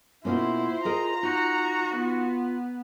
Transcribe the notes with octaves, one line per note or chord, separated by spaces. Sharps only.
B2 A#3 C#4 E4 F4 C5
G#4 A#4 D#5 A#5
D#4 F#4
B3 F4